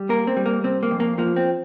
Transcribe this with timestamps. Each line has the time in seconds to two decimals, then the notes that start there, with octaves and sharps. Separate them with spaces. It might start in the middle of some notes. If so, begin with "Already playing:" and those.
Already playing: G3
0.09 A#3 A#4
0.27 C4
0.37 G3
0.46 A#3
0.64 C3 C4
0.83 A#3
0.91 F2
1.00 A#3
1.18 F3 A#3
1.36 C4